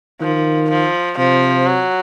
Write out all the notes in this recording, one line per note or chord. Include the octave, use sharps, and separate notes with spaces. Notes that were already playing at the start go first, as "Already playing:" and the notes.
D#3 F3
F3
C3 F3
F#3